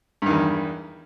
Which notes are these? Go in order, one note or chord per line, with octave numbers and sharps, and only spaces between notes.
E2 G2 D#3